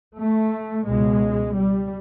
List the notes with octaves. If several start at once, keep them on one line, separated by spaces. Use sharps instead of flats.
A3
C#2 B2 G#3
G3